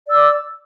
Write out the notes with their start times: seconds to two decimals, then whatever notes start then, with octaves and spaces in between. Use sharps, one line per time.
0.06 D5
0.10 E6
0.14 D6